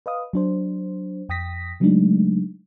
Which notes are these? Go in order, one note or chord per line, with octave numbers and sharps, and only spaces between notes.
B4 D#5 F5 D#6
F#3 D4 C5
F2 G5 D#6 A#6 B6
C#3 F#3 G#3 A3 D4 D#4